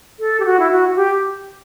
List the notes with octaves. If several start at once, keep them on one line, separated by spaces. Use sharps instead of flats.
A4
G4
F#4
E4
F#4
F#4
G4